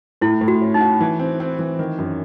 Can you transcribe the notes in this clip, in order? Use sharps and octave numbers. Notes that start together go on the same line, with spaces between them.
A2 E4
A2
F#4
C#4
D#4
F#4
E3
C4
C4
E3
D#3
F#2